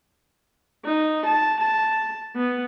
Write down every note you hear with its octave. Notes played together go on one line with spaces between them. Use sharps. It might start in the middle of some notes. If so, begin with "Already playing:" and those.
D#4
A5
A5
B3